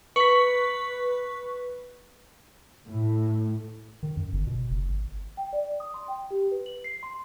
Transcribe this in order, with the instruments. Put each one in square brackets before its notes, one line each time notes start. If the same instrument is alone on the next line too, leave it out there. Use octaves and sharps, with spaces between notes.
[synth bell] B4 [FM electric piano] C#6 B6
[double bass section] A2
[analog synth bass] D#3
F#2
G1
B2
F#1
G#1
[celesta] G5
D5
D#6
C6
G5
G4
B4
F#7
C7
C6